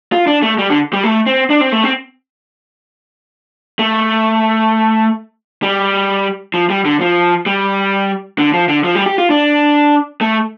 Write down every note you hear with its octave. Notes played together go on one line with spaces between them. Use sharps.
F4
D4
A3
G3
D3
G3
A3
C4
D4
C4
A3
C4
A3
G3
F3
G3
D3
F3
G3
D3
F3
D3
F3
G3
G4
F4
D4
A3